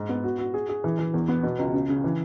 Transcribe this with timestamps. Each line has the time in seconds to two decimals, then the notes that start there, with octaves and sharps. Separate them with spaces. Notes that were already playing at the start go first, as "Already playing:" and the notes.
Already playing: G#2
0.09 B3
0.24 F#4
0.38 F#4
0.54 G#4
0.69 G#4
0.84 E3
0.99 E3
1.14 E2
1.28 B3
1.43 B2
1.59 C#2
1.73 C#3
1.89 C#3
2.04 E3